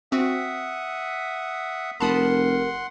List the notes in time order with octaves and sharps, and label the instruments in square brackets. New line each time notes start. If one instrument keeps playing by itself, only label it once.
[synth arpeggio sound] C4 F#4 [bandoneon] E5 F#5 D#6
[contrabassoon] F1 [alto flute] A#4 [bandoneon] F#5 C6 [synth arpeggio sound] A5 B5 D#6